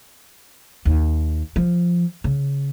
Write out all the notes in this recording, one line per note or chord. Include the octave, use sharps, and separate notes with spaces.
D#2
F3
C#3